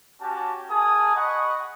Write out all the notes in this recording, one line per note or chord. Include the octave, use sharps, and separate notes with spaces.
C#4 F#4 G4 A5
A#3 G#4 G#5 A5 D#6
D#5 F#5 B5 C#6 D#6